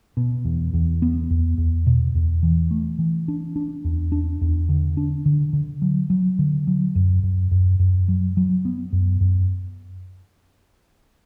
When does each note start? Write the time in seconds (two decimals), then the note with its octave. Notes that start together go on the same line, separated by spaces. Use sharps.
0.17 B2
0.45 E2
0.74 E2
1.02 B3
1.30 E2
1.58 E2
1.87 B2
2.15 E2
2.43 E3
2.71 A3
2.99 E3
3.28 D4
3.56 D4
3.85 E2
4.12 D4
4.41 E2
4.69 D3
4.97 D4
5.26 D3
5.53 D3
5.82 F#3
6.10 F#3
6.39 D3
6.67 F#3
6.95 F#2
7.23 F#2
7.51 F#2
7.79 F#2
8.08 F#3
8.37 F#3
8.65 B3
8.93 F#2
9.21 F#2